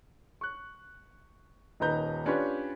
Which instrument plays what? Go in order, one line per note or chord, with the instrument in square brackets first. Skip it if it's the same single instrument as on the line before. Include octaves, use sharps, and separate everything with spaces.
[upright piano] C#6 F#6
D#1 D#3 D#4 B4 A#5 G6
C#4 D4 F4 G4 B4 C#5